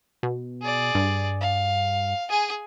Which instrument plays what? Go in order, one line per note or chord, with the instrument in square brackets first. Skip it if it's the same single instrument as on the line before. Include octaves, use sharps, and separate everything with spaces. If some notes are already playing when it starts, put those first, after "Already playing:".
[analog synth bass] B2
[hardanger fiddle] G#4 D5
[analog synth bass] G2
[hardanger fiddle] F5
G#4 G#5